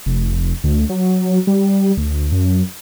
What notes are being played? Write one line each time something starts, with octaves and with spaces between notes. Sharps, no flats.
F1
D2
F#3
G3
D2
F#2